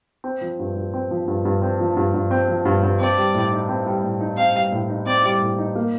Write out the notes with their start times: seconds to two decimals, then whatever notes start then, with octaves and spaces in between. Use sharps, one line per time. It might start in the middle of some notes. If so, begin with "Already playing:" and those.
0.24 C4
0.41 F3
0.59 G2
0.76 G2
0.94 C4
1.11 F3
1.28 G2
1.45 G2
1.62 C4
1.80 F3
1.97 G2
2.14 G2
2.31 C4
2.49 F3
2.65 G2
2.83 G2
3.00 C4 D5
3.17 G3
3.34 A2
3.52 D#4
3.69 C4
3.86 G3
4.04 A2
4.21 D#4
4.38 C4 F5
4.54 G3
4.72 A2
4.90 D#4
5.06 C4 D5
5.24 G3
5.41 A2
5.58 D#4
5.76 A#3